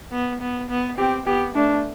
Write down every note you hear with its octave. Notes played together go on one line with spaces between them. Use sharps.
B3
B3
B3
C4 G4
B3 G4
A3 D4